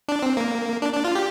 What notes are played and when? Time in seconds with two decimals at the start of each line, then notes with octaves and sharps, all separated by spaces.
0.08 D4
0.23 C4
0.37 A#3
0.82 D4
0.93 D4
1.05 F4
1.15 G4